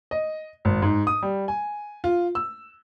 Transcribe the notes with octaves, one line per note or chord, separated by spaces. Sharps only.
D#5
G#1
G#2
D#6
G3
G#5
F4
E6